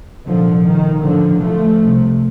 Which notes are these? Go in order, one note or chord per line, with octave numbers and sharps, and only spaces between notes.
C2 A#2 D3 F3
D#3
A1 A2 D3 F3
F3 A3
C2 C3